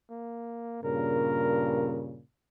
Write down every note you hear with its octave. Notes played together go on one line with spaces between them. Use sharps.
A#3
G2 A#2 C#3 A#4